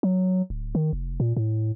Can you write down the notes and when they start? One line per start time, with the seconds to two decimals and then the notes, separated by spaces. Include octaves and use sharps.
0.03 F#3
0.50 D1
0.75 D#3
0.93 F1
1.20 A#2
1.37 A2